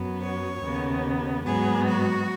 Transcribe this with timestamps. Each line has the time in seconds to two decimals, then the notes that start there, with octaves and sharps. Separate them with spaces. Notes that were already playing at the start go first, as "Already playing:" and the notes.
Already playing: F#2 F#3 B3
0.22 C#5
0.63 D#2 C#3 B3
1.46 G#2 F#3 B3 G#4
1.87 F#4